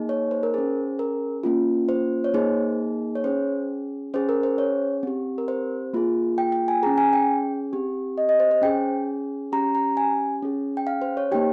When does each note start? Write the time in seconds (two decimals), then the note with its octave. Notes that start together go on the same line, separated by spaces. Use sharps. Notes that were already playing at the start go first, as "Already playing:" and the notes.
Already playing: A#3 D#4 G#4
0.09 C#5
0.31 C5
0.43 A#4
0.54 C#4 G#4 C5
0.99 A#4
1.43 A#3 C#4 F4
1.89 C5
2.24 C#5
2.34 A#3 D#4 G#4 C5
3.15 C#5
3.24 C#4 G#4 C5
4.14 C#4 G#4 C5
4.29 A#4
4.43 C5
4.58 C#5
5.03 C4 G4
5.38 A#4
5.48 C5
5.94 A#3 F4 G#4
6.38 G5
6.52 G5
6.68 G#5
6.83 G#4 A#5
6.86 C#4
6.98 G#5
7.13 G5
7.73 C4 G4
8.18 D#5
8.29 D#5
8.40 C5
8.51 C5
8.62 C#4 G#4 G5
9.52 C#4 G4 A#5
9.75 A#5
9.97 G#5
10.43 C#4 G#4
10.77 G5
10.87 F5
11.01 C5
11.17 C#5
11.32 A#3 D#4 G4 G5